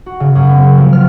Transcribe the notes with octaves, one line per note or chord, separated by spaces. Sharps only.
F#4
C#3
F#2
B3
C4
F3
F6